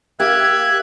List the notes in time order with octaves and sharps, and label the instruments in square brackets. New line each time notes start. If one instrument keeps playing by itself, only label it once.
[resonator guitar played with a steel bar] A#3 G4 [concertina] E5 F#6 [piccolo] G#6